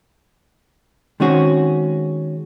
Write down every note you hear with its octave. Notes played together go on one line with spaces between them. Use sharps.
D#3 G#3 C4 C#4 F#4